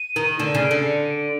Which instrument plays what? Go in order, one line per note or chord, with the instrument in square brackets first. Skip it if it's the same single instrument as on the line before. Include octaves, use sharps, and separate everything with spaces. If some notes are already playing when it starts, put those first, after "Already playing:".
Already playing: [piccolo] D#7
[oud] D#3
[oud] D3 [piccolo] E7
[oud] C#3 [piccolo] D#7
[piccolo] D7
[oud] D3 [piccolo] C7
[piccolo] C#7
D#7
D7